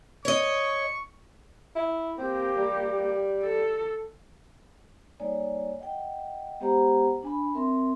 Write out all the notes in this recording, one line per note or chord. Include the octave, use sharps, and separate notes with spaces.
C#5 D#5 C#6
E4
A#3 C4 G4
G3
A4
G3 A#3 D#4 C#5 D5 G#5
D#5 F#5 G5
G#3 B3 G4 C5 F#5 A#5
D4 G#5 B5
C4 A#4 E5 C6